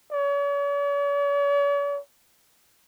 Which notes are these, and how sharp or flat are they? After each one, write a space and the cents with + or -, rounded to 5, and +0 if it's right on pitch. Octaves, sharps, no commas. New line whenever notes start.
C#5 +45